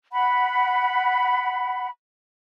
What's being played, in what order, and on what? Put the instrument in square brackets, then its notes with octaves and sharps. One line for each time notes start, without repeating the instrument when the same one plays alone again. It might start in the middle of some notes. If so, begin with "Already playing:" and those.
[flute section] F#5 B5